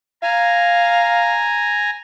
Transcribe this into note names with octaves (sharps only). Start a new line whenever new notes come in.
F5 G#5 A#5